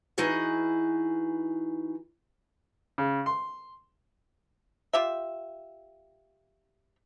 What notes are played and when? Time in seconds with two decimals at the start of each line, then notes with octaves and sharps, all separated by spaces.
0.18 E3 D#4 F#4 G#4 B4
2.98 C#3
3.26 C6
4.93 F4 G4 E5